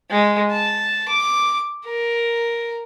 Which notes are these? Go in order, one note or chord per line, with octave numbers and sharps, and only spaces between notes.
G#3
A5
D6
A#4